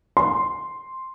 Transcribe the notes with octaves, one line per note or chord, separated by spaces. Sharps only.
C6